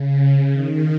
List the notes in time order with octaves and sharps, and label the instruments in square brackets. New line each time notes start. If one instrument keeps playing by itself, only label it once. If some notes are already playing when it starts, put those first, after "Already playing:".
Already playing: [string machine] C#3
D#3